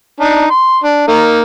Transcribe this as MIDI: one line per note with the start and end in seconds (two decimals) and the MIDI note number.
0.20 0.46 62
0.20 0.46 63
0.50 0.78 84
0.84 1.04 62
1.07 1.42 58
1.07 1.42 63